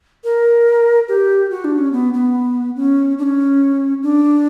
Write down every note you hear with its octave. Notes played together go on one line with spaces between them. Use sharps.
A#4
G4
F#4
D4
C#4
B3
B3
C#4
D4
C#4
D4